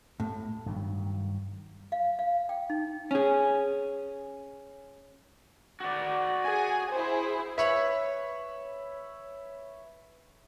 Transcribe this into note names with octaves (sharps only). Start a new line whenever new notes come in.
A2
G2 D#3 F#3
F5
F5
G5
D#4
C#4 G#4
F#4 D5
G#4 G#5
E4 G#4 C5
B4 C#5 E5 B5